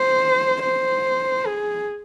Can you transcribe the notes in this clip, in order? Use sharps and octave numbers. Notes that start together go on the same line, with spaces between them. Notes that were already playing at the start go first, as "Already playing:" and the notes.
Already playing: C5
C5
G#4